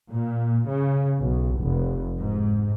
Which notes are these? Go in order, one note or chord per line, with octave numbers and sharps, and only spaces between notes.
A#2
C#3
B1
F1
G#2